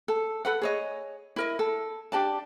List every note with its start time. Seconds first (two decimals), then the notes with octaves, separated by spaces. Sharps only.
0.08 A4
0.45 A4 B4 F#5
0.62 G#4 C#5 D#5
1.36 E4 A#4 D#5
1.59 A4
2.12 D4 G4 D5 A5